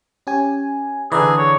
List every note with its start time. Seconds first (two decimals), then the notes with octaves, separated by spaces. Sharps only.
0.27 C#4 G4 G#5
1.12 D3 E3 G#4 B4 D5 A#5
1.38 C#5